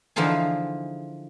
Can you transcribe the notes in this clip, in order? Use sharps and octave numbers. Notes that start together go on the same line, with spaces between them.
D3 E3 F3 D#4 F4 G#4